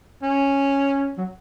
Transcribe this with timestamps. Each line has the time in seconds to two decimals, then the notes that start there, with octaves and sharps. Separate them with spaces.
0.22 C#4
1.17 F#3